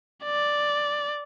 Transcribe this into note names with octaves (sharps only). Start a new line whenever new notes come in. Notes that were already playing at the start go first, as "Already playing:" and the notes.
D5